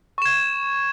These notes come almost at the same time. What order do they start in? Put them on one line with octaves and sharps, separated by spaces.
C#6 E7 G#6